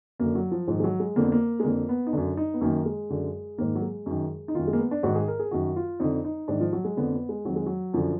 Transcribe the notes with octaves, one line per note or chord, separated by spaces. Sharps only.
F#2 D3 A#3
F#3
F3
G#2 D#3 F3
G#3
F#3
G#3
F2 D3 A#3
B3
A#3
G#3
F2 D3 A#3
B3
D#4
F#2 D3 D4
D#4
B3
F#2 D#3 A#3
G#3
F#2 D3
G#2 D#3 A#3
F#3
G#3
F#2 D#3
D#4
F#2 D#3 F4
G#3
A#3
B3
D4
G#2 D#3 F#4
G#4
A#4
G#4
F#2 D#3 F#4
F4
F2 D3 D#4
D#4
G#2 D#3 D4
F3
F#3
G#3
F2 D3 B3
B3
G#3
F2 D#3 F#3
G#3
F#3
F#2 D3 F3